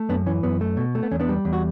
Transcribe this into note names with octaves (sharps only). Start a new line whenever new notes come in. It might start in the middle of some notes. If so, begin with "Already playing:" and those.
Already playing: A3
F#2 B3 D4
E3 C#4
F#2 B3
A3
B2
A3
B3
E2 C#4
B3 D4
G3
E2
F#4